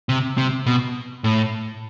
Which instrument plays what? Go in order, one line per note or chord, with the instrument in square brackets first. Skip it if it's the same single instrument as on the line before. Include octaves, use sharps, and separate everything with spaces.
[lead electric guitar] C3
C3
B2
A2